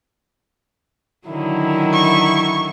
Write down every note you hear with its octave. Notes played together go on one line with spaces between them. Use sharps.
D3 D#3 F#3 E4
C#6